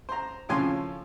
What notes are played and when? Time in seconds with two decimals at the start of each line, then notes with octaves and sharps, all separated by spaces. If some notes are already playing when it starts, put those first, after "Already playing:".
0.09 C5 A#5
0.49 A2 C#3 F3 C4 G#5 C6